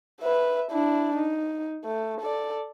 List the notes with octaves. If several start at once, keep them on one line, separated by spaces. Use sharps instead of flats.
B4 E5
D4 E4
D#4
A3
A4 D5